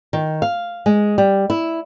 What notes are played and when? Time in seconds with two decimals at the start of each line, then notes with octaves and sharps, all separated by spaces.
0.13 D#3
0.42 F5
0.86 G#3
1.18 G3
1.50 E4